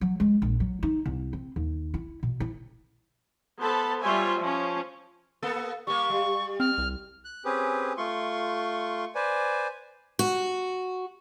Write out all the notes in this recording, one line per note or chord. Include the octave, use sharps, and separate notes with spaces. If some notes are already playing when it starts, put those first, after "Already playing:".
F#3
G#3
A#1
F#3
D#4
C2
C4
D#2
E4
B2
E4
B3 A4 C5 A5 B5
G3 F4 C5 C#5 E5 G#5
F3 C#4
A#3 B3 A4
G3 A#3 C#6
G3
C4 F6
C2
F#6
C4 C#4 G4 G#4 B4
A3 F4 C6 C#6
B4 C5 D5 G#5
F#4